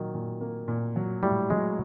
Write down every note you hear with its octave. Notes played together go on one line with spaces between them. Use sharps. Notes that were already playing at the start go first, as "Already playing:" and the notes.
Already playing: A#2 D#3 F#3
A#2
A#3
A#2
F#3
A2 G3
F#3 G#3